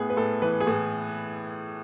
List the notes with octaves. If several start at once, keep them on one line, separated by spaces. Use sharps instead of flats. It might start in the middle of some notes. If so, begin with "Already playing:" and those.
Already playing: A2 B3 G#4
B4
A2 A4
E3 B4
G#4
A2